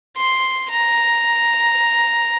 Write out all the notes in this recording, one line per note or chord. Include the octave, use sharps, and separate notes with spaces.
C6
A#5